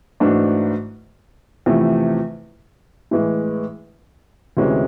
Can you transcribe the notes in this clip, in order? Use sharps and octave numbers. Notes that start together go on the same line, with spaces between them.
G#2 E3 A3 D4 F#4
E2 C3 F3 A3
A2 E3 G#3
D2 C3 E3 G#3 C#4